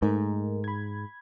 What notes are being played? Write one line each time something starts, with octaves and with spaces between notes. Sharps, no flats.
G#2 A3 D#4 A#4
B5 G#6